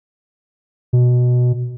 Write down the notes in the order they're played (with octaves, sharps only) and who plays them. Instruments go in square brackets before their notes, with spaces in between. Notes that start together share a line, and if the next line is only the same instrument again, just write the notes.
[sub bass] B2